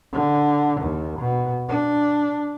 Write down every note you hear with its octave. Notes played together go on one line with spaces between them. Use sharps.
D3
D#2
B2
D4